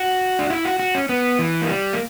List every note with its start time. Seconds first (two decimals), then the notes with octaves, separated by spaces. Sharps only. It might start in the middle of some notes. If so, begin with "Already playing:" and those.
Already playing: F#4
0.39 D4
0.50 E4
0.65 F#4
0.79 F#4
0.95 C#4
1.09 B3
1.39 E3
1.62 A#3
1.68 G3
1.93 A#3